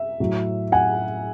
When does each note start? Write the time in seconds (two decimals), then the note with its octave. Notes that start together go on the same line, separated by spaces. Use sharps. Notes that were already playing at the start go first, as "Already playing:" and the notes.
Already playing: E5
0.20 A2 F#3
0.72 F#5 G#5